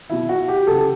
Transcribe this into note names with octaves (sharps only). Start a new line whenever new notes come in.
B2 F#3 E4
F#4
G4
C#3 F#3 A4